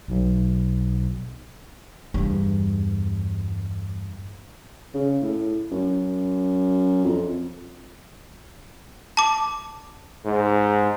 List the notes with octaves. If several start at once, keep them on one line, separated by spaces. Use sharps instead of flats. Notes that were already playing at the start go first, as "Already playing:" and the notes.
B1
E2 G2
C#3
A2
F#2
F2
A5 D6
G#2